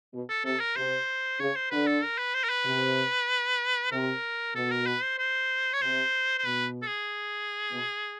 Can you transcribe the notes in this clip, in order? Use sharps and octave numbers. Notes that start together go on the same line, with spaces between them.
B2
A4
C3 A4
A#4
C3 C5
C#3 C#5
C5
D3 B4
A4
A#4
B4
C5
A#4
B4
C3
C3 A#4
B2 A4
A#4
B4
C5
C5
C#5
C3 C5
C5
B2 B4
A4
G#4
B2